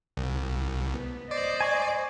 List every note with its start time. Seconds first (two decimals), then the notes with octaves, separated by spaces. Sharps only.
0.17 C2
0.93 B3
1.31 C5 D5 D#5
1.61 G#5 C#6